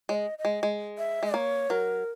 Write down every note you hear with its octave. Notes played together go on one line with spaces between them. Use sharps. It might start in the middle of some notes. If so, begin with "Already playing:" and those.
G#3 C#5
D#5
D#5
G#3
G#3
E5
G#3
A#3 C#5
F#3 A#4